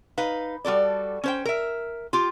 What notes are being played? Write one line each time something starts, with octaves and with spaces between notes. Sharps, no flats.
D#4 B4 F5
G3 F#4 A4 D5
C#4 C5 G5
A#4 E5
F4 G4